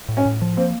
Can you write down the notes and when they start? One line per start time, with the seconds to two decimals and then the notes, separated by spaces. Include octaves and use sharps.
0.09 A2
0.17 C#4
0.26 A2
0.41 F3
0.57 A#3 C4